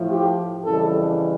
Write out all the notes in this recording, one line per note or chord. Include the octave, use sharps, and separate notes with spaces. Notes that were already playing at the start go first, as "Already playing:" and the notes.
Already playing: A2 F3
G4
F2 C#3 E3 G3 A4